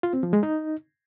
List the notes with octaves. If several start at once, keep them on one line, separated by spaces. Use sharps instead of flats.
F4
C4
F3
G#3
D#4